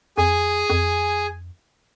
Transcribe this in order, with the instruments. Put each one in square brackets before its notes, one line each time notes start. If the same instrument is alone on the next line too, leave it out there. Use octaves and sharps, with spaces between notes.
[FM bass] F2 [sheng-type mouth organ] G#4 G#5
[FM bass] F2